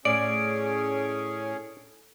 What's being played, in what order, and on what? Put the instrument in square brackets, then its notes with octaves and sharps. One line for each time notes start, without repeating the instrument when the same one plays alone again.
[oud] A2 [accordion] C#4 G#4 [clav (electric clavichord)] D5 [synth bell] D7